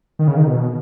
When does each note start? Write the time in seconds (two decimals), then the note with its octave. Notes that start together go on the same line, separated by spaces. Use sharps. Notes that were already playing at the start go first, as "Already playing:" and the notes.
0.19 D#3
0.27 C#3
0.37 D#3
0.47 B2